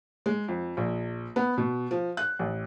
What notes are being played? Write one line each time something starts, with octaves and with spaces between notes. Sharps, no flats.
G#3
F2
A#1
B3
B2
F3
F#6
A1